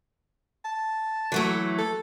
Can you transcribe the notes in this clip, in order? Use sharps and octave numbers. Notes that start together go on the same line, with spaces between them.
A5
E3 F#3 A3
A4